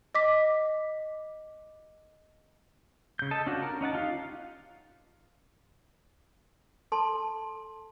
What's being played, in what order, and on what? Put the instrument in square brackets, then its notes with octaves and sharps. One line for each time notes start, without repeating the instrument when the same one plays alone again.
[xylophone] D#5 D6 B6
[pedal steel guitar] C#3 G6
A4 D#5 A5
C#4 D4 F4 F#4
A#4
C#4 D#4 F#5 A5
D#4 F4 G4 F5
[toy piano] A4 A5 C6